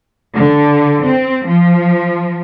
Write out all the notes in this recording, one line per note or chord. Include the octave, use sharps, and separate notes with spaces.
D3
C4
F3